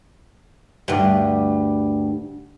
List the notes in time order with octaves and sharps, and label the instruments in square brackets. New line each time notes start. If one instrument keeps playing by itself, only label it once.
[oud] D2 G2